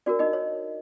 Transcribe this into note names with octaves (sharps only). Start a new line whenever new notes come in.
D4 F#4 A#4 D5
D#4 D#5
C#5